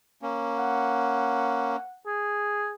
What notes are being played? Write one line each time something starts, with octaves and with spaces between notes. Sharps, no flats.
A#3 C#4
F#5
G#4